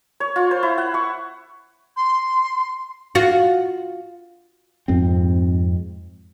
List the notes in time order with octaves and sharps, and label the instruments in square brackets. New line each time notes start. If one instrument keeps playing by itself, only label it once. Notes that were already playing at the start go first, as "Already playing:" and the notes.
[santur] C#5
F4
C5
E4
F#5
C#6
[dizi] C6
[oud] F4 F#4
[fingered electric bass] F2 G#2 C4